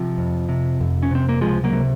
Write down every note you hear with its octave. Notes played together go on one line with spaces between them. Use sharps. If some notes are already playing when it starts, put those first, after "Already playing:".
Already playing: C3 F3
F2
C3
F2
C#4
C3 C4
A#3
C#2 F3 G#3
F#3 A#3
C3